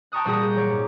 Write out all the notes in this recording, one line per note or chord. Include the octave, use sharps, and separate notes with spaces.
G5 A5 A#5 C#6 D#6 F#6
A#2 G3 F#4 G#4 A#5 D#6
G6
F#3 C#5 D6
G#2